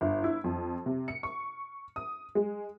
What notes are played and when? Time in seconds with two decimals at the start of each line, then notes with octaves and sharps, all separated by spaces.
0.01 G1
0.24 E4
0.44 F2
0.86 C3
1.08 C#7
1.23 C#6
1.96 D#6
2.35 G#3